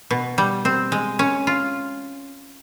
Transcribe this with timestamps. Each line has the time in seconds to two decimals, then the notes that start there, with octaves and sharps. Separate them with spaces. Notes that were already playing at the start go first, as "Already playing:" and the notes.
0.11 B2
0.38 G3
0.65 C4
0.92 G#3
1.19 C#4
1.47 F4